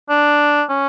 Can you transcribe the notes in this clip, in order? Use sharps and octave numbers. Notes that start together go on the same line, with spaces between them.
D4
C#4